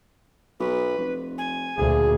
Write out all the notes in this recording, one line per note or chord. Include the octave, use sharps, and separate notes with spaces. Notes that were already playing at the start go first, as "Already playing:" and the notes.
B1 B4
F1
G#5
D2 A#2 G#4